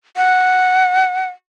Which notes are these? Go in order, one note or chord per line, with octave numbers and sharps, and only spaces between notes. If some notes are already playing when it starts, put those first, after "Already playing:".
F#5